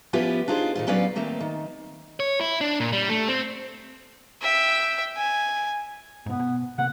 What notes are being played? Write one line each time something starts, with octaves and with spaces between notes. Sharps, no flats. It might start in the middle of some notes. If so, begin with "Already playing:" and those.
F3 B3 C#4 E4 F4 G4
D4 D#4 F4 G#4 C5
A#2 D#3 F4
F#3 B3 C#4 B4 D5 F5
D#3 A3 A#3 C4
D#3
C#5
E4
D4
A#2
G3
A3
C4
E5 G5
G#5
G#2 B2 B3
B2
C3 A#3 F#5